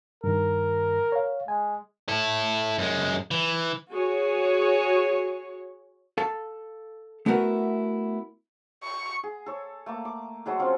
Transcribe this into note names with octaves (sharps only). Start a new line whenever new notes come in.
G2 D#3 A#4
C#5 F5
G#3 G#5
E4 A4
F#2 G#3
E3
F#4 G#4 C#5
A4 F5 A5
A3 B3 E4 F#4 A#4 B4
C#6
G#4
A4 C#5
A3 A#3 D6
D6
F#3 G#3 A4
C4 C#4 F4